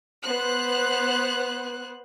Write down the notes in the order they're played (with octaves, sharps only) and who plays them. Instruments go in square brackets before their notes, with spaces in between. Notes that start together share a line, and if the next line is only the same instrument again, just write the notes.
[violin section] B3 C5 F#6